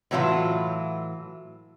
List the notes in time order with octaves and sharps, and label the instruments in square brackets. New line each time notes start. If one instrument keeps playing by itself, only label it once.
[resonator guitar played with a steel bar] A2 E3 F#3 E4 F4